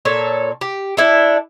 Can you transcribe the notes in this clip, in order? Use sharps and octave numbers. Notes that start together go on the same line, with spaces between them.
A#2 A4 C#5
G4
D4 E4 A4